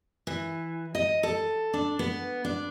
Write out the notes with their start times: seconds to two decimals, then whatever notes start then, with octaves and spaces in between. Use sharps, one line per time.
0.27 E3
0.95 D#5
1.23 A4
1.74 D4
1.99 B3
2.45 D4